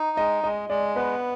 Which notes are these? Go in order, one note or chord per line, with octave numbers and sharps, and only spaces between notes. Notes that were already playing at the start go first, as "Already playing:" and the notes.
Already playing: D#4
G#3 D#5
G#3 D#5
G#3 D5
B3 B4